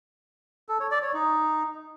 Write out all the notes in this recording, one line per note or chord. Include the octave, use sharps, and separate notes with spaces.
A4
C#5
D5
C#5
D#4